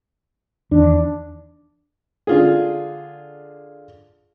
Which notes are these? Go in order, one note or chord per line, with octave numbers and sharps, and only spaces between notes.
E2 D#3 D4
D3 F4 G#4